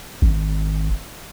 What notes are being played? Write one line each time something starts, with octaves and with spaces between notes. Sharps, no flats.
G#1